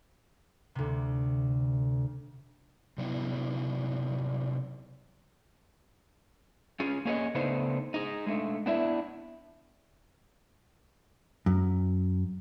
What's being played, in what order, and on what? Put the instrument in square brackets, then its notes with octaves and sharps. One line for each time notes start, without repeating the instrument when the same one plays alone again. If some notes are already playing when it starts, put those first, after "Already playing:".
[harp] D2 C3
[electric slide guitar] C3 F#3 B3 D#4 E4
C#4 F4 G#4
A#3 C#4 G#4 C5 C#5 D#5
C#3 A3 B3 D4 D#4 C5
D#4 G#4
G#3 A3 D4
B3 D4 E4 E5
[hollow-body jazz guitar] F#2